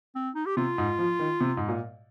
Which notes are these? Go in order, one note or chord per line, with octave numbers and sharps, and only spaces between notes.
C4
D#4
G4
C3 F4
G#2
F3
D#3
C3
G#2
A#2